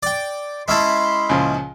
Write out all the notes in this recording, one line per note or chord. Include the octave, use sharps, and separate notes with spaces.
D5 G5
G#3 C#4 E4 E5 A5 B5 C6
C#2 A#2 F3